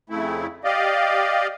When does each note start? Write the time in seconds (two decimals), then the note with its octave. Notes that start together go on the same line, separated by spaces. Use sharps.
0.10 F2 C#3 A3 E4
0.64 G4 D5 D#5 F5